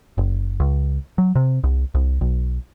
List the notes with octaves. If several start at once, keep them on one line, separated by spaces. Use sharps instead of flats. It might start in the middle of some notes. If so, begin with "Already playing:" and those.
F#1
C#2
F#3
C3
C2
C2
B1